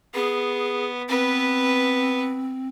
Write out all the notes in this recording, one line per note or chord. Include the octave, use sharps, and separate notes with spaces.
B3 G#4
B3 C4 B4